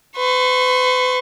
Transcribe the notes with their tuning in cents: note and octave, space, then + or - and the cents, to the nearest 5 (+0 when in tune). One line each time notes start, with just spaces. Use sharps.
B4 +40 C#6 -30